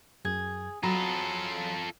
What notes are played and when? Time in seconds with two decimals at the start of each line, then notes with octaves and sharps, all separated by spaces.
0.25 F#2 G#4 G#6
0.83 F#3 F4 G#4 A4 A#5 B5